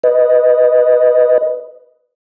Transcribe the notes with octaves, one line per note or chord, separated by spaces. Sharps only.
B4 D#5